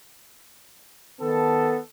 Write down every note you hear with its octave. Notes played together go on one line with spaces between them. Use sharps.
D#3 B3 A4